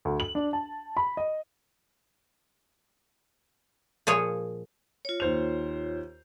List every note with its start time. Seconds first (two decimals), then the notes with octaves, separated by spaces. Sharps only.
0.05 D2
0.20 F#7
0.35 D4
0.53 A5
0.97 B5
1.17 D#5
4.07 A#2 F3 G#4 C#5
5.05 F4 C#5
5.20 D#2 C5 F7